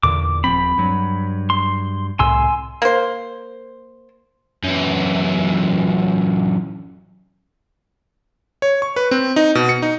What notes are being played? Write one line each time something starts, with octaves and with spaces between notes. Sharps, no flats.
E2 A#2 D3 D6
D#1 F3 C4 B5
G2 F#3
C6
C2 A2 C3 G#5 C6 E6
A#3 C5
F#2 E3
C#5
C#6
B4
C4
D#4
B2
C#7
D#4